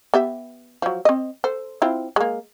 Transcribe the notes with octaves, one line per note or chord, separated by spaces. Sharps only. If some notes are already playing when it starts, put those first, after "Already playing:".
B3 G4 E5
F3 F#3
C4 D#5
A4 C5
C4 E4 F4
G#3 A#3